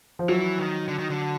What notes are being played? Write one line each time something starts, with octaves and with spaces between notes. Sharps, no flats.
F3
E3 F#3
D#3
D3
D#3
D3